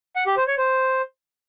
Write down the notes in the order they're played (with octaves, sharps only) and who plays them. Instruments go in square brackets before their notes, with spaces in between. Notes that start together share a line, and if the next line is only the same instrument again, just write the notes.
[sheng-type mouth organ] F#5
G4
C5
C#5
C5